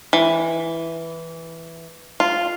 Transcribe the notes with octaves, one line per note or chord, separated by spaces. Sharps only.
E3
F4